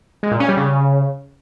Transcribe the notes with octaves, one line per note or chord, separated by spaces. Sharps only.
G#3
A#2
C#4
G3
C#3